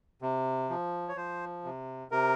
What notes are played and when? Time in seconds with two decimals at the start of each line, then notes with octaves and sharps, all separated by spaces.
0.22 C3
0.70 F3
1.08 C#5
1.16 F3 C5
1.64 C3
2.11 C3 A#4